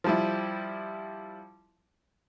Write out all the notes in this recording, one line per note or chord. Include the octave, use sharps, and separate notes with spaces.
F3 G3 E4